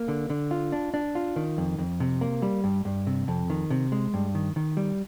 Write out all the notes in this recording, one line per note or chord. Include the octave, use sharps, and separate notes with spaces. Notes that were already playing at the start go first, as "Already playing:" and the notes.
Already playing: A#3
D3
D3
F4
D4
D4
F4
D#3
F2
F2
C3
A#3
G3
G2
G2
C3
F2
D#3
C3
G#3
G2
D#3
D#3
G3